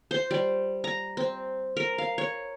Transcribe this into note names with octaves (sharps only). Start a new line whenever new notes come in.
C5
G3
A#5
C4
A#4
F5
C#5